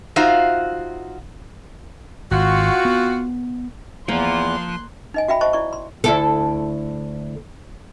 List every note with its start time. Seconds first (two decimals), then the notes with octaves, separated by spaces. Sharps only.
0.16 D#4 F4 F#4 C5 E5 F5
2.31 G#1 C4 F4 F#4
2.85 B3
4.08 E2 F3 A#3 C6 F#6
5.14 D#4 D#5 G#5
5.28 F#4 E5 G5 B5
5.41 C5 D#5 A5 C#6
5.53 E4 D5 C#6
5.73 C6
6.04 D2 E4 A4